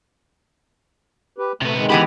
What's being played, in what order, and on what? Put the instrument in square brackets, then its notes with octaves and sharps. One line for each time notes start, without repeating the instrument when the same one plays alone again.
[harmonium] G4 B4
[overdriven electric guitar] C3 B3 [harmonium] A3
[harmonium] D#3 G#3
[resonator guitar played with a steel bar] E3 B3 G4 [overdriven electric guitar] G#5 B5